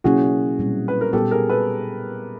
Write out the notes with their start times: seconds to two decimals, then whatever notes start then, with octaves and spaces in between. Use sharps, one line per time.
0.04 B2 F#3 A#3 C#4 E4 F#4 G#4
0.59 A#2 G3 C4
0.88 B4
1.01 A#4
1.13 A#2 G3 B3 G4 A4
1.31 G#4 A#4
1.49 A4 B4